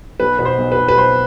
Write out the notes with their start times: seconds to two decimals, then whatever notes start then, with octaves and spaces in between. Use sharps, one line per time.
0.20 B1 B4
0.39 B2 B4
0.45 C5
0.58 B1
0.72 B4
0.78 B2
0.88 B4
0.97 B1 C5